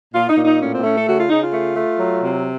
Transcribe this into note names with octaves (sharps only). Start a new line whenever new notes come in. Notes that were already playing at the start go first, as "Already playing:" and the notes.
A#2 F4
D#4
A#2
D#4
A2 C#4
C4
A3 C#4
A4
C#3 F#4
F4
C#3 D#4
F4
A3
A3
F#3
C3